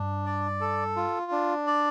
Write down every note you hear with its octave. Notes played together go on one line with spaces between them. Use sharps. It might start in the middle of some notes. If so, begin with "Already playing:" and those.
Already playing: G2 D4
D5
A4
F4
D4
D5